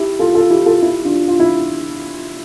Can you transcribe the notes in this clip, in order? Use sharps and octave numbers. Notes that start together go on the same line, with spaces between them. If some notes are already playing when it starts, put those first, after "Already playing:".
Already playing: E4 G4
F4 A4
F4 A4
E4 G4
F4 A4
E4 G4
D4 F4
F4
E4